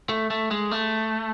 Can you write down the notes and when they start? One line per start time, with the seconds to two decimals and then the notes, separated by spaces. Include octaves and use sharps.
0.09 A3
0.30 A3
0.51 G#3
0.71 A3